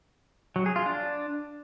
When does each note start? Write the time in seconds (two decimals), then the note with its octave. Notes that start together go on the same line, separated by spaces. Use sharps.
0.56 F#3
0.66 G#4
0.76 F4
0.86 D4